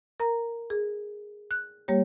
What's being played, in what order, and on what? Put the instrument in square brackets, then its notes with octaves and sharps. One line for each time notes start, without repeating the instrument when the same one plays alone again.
[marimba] A#4 A#5
G#4
F#6
G3 A#3 G4 C#5